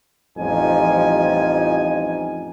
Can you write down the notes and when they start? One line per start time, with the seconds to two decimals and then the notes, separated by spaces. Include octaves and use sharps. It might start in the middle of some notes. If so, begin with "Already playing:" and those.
0.38 A1 F2 F3 G3 D#4 G#5